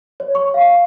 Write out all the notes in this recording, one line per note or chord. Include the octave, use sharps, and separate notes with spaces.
C#5
C#6
F5